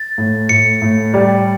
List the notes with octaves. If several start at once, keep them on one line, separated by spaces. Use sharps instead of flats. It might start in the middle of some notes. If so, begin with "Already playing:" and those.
Already playing: A6
A2
A2 C#7
A2
G3